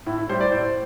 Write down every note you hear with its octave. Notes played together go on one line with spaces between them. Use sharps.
A2 E4
E4
G3 C5
D5
A2 C5